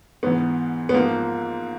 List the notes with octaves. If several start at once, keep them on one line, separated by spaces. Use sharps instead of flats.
G#2 E3 B3
B3
G#2 F3 A#3